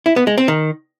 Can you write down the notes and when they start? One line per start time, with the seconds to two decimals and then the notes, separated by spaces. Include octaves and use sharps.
0.06 E4
0.16 B3
0.27 G#3
0.38 C4
0.48 D#3